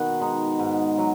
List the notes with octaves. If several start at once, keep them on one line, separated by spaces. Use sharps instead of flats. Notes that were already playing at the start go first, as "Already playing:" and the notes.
Already playing: B2 D#3 F#5
G#3 D#4
G#2
F#3